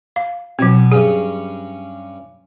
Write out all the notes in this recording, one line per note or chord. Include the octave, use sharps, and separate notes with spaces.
F5
B2 F#3 C4
G2 C#4 G#4